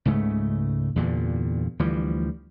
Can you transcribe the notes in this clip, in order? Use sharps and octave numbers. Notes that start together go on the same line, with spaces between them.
C#2 G#2 C#3 A3
E2 G2 A#2 D3
D2 E3 F3 G3